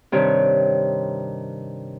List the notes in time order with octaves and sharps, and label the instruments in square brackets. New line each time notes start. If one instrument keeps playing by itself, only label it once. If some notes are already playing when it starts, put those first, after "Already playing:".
[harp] G2 C3 D#3 D4 C#5